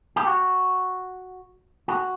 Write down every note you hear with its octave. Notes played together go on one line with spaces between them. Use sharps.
G4
F#4
F#4